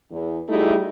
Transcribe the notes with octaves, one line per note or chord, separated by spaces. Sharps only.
E2
G3 A3 D#4 E4 F#4 G#4